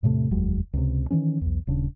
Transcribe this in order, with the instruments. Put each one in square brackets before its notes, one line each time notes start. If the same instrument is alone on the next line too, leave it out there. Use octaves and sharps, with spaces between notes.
[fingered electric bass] E2 A2 C3 A3
F1 D#2 F#3 G#3
C#2 C3
D#3 E3 G#3 C#4
B1 E2
D#1 C#3 D4